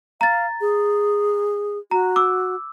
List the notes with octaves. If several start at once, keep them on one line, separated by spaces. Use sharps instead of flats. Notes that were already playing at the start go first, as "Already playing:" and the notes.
F5 A#5 A6
G#4
F#4 A#5
D6 E6